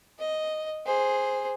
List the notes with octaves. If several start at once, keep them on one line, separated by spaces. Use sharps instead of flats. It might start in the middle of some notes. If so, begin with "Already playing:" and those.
D#5
G#4 C5